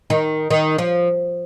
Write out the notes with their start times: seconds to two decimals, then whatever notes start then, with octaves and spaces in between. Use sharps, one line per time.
0.10 D#3
0.50 D#3
0.78 F3